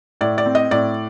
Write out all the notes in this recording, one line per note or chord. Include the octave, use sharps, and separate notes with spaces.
A2 D5
D5
C4
D#5
A2 D5